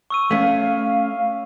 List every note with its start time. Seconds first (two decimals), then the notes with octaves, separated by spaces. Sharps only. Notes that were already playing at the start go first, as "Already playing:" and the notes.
0.10 C#6 E6 D#7
0.31 A3 C#4 F5